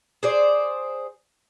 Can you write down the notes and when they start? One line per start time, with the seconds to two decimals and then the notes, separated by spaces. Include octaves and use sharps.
0.23 G#4 C5 D5